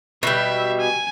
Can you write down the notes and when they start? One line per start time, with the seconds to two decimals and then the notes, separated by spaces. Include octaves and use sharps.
0.23 B2 G3 E5
0.80 G#5